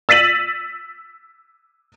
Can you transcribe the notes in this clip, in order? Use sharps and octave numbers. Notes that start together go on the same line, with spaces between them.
E6 A6 B6 D#7 F#7